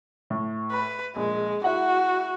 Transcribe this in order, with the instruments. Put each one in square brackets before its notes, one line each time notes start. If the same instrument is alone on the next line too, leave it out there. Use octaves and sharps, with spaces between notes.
[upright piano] A2
[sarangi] B4
[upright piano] A#1 [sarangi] G#3
[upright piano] E4 E5 F#5 [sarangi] F#4